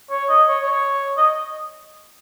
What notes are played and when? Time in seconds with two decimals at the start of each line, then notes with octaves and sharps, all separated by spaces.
0.10 C#5
0.29 D#5
0.48 C#5
0.67 C#5
1.17 D#5